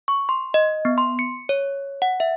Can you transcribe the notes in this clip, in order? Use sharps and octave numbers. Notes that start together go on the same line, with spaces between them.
C#6
C6
D#5
B3
C6
C#7
C#5
F#5
E5